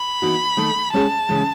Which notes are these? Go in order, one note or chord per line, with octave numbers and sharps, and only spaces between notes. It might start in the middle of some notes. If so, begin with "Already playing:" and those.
Already playing: B5
E3 B3 D#4 F#4
D#3 A3 D#4
G#3 C#4 G#4 A5
C#3 E3 G#3